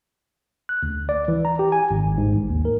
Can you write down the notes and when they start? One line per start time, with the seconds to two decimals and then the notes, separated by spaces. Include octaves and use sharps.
0.69 F#6
0.83 D2
1.09 D5
1.28 E3
1.45 A#5
1.59 G4
1.72 G#5
1.91 G#1
2.18 G#2
2.35 A1
2.50 D#2
2.65 A#4